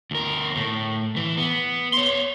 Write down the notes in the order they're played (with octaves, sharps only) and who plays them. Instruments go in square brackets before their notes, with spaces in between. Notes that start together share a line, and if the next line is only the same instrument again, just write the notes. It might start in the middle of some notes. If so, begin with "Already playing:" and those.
[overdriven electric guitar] D2 A#4
A2
E3
B3
C#5 C6